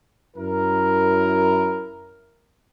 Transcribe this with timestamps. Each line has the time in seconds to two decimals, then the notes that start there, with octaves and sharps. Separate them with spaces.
0.37 F#2 E4 A#4